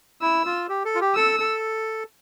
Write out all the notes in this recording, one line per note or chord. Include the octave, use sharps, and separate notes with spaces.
E4 E6
F4
G4
A4
F4
G4
A4 E6
A4